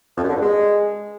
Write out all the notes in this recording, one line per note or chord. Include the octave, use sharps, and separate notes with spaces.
F2
F#2
D3
G2
G#3